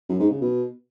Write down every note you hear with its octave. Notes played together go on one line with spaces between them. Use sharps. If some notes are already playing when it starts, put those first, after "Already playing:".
F#2
G#2
C#3
B2